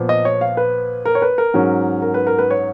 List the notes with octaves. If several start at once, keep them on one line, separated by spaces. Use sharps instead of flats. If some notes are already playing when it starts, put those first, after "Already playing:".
Already playing: A#2 F3 B3
D#5
C#5
F5
B4
A#4
C#5
B4
A#4
G#2 F#3 C#4
A#4
B4
A#4
B4
C#5